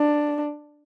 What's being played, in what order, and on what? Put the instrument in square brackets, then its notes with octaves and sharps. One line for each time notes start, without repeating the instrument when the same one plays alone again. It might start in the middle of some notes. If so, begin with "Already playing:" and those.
Already playing: [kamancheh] D4